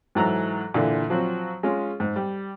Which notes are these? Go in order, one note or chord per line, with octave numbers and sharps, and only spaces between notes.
G#2 E3 F#3 A4 A#5
A#2 D3 E3
F3 F#3 C4 F#4
G#3 C#4 F4
G#2
G3